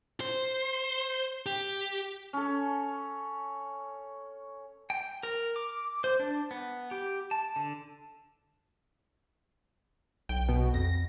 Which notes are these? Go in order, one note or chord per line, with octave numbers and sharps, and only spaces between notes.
C5
G4
C#4 A4
G5
A#4
D6
C5
D4
B3
G4
A5
D3
B1 G5
B2
F2 A#6